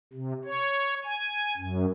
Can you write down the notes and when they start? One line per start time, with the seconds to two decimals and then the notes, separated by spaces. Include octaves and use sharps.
0.13 C3
0.45 C#5
1.04 G#5
1.57 F#2